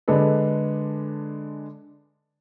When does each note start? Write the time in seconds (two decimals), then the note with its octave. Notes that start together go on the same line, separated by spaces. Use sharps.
0.08 D3 G#3 D4 A4 B4